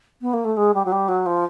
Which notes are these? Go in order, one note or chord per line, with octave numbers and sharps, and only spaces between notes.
B3
A#3
A3
G#3
G3
F#3
G3
F#3
F3